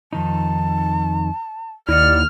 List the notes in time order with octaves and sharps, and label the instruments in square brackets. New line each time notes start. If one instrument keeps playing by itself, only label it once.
[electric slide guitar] F2 D#3 D#4 [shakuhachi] A5
[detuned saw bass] D#2 [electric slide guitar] E4 D#5 F#5 [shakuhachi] D5 [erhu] F6